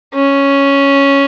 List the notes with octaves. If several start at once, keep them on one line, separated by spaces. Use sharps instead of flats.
C#4